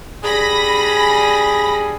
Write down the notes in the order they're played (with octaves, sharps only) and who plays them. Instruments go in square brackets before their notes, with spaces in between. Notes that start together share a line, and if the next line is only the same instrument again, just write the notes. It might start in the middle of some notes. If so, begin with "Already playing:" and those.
[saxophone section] G3 D4 G#4 [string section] B5 A#6